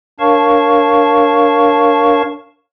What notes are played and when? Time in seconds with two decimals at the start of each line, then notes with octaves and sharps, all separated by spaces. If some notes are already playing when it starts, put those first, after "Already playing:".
0.20 D4 A#4 C#5 F5 A5 C#6